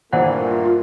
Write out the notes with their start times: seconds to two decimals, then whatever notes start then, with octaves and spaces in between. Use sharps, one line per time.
0.13 G2 A#2 E3 A3 A#3 F4 C5 F#5